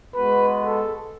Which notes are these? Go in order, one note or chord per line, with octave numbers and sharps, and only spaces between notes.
G#3 B3 F#4 B4
A4